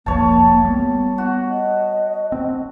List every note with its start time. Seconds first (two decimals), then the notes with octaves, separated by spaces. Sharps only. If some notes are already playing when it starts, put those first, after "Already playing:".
0.06 F1 B1 F3 A#3 C#5 A5
0.65 G3 B3
1.18 F#4
1.49 D#5
2.32 C4